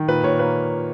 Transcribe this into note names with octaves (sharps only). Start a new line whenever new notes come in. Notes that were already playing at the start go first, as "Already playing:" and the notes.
Already playing: D#3
A#2 B4
A#2 C#5
A#3 B4